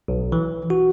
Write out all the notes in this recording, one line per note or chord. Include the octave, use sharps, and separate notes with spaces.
B1
E3
F#4